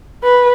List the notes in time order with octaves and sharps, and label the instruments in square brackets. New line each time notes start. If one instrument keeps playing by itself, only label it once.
[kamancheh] B4